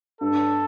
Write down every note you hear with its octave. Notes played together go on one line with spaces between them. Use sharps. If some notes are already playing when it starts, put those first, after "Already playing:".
G2 A4